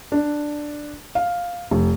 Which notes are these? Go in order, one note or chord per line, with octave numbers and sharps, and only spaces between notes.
D4
F5
F1